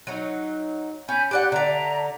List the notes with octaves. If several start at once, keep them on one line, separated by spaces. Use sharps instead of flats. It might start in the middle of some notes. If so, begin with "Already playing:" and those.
F#3 D#4
C#4 G#5 B5 G6
G4 D5 F#5 F#6
D3 D5 E5 A5 A#5